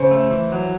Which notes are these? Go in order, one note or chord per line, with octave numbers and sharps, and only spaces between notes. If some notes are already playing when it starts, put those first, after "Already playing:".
Already playing: C#3 C5
A3
E3
F#3